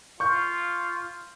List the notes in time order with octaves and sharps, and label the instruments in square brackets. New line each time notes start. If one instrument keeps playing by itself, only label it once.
[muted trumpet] F4 [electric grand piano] C#6 G6